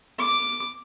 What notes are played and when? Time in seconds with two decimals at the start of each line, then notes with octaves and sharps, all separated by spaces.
0.19 D6